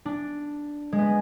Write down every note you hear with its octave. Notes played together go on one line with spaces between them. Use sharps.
D4
G#3
B3